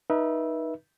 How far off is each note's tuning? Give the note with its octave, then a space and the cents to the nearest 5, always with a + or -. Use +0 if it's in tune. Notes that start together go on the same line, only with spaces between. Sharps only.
D#4 +0 B4 -30 E5 +0